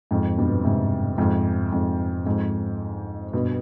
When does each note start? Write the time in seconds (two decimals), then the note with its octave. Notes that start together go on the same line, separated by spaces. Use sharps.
0.11 F2 G#2
0.37 G2 B2
0.65 G#2 C3
1.18 F2 G#2
1.72 F2 G#2
2.26 F2 G#2
3.33 G2 B2